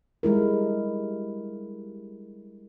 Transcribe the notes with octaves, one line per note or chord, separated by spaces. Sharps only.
G3 G#3 E4 A#4